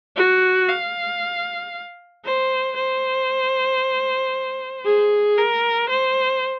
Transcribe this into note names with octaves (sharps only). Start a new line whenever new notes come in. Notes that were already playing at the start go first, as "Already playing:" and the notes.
F#4
F5
C5
C5
G#4
A#4
C5